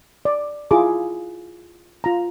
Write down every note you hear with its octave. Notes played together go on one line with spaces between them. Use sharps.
D5
E4 F4 G#4 A#5 D6
F4 A#5